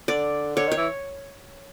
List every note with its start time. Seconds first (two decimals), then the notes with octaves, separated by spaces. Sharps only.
0.08 D3 D5
0.56 D3 C#5
0.67 D#3
0.72 C#5
0.77 E3